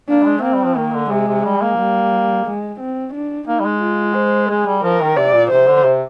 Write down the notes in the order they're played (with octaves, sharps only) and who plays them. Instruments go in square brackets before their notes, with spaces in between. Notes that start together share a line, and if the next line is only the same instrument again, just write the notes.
[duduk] A#3 [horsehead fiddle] D4
[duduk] G3
G#3
[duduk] A#3 [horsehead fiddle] C4
[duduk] G3
F3
[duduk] D#3 [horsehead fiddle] A#3
[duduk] D3
[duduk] C3 [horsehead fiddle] G#3
[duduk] C3
G3
A#3
[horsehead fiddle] G3
G#3
C4
D4
[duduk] A#3 [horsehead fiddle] D#4
[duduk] G3
G#3
[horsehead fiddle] F4
C5
[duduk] G#3 [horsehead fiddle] G#4
[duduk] G3
[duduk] F3 [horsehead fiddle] A#4
[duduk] D#3
[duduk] C3 [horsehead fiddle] D5
[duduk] A#2
[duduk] C3 [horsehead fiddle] C5
[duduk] D3
C3